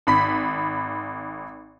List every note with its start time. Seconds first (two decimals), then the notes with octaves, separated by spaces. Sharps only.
0.07 G#1 B5 B6